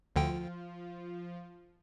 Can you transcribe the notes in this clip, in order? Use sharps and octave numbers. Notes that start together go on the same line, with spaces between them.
D2 D3 F3 F4 G5